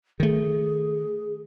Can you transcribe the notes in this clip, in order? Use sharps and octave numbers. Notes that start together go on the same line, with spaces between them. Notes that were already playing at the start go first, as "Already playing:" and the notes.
D#3 A3 G#4